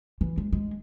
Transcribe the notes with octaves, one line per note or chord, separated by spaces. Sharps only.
E3
G#3
G#3